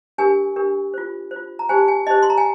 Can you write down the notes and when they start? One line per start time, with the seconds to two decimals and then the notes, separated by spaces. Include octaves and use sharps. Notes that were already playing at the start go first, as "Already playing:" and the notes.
0.18 D4 G4 A#4 G#5
0.56 D4 G4 A#4
0.94 F4 C5
1.31 C5
1.36 F4
1.59 A#5
1.69 D#4 G4 C5 G#5
1.88 G#5
2.07 D#4 G4 C5 D#5
2.22 C6
2.30 A#5
2.38 G#5